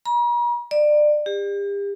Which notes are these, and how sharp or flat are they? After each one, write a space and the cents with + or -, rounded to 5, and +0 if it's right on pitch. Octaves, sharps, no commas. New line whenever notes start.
A#5 +45
D5 +25
G4 +40